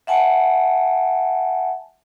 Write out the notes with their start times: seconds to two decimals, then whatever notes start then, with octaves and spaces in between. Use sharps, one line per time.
0.07 E5 F#5 G#5 A5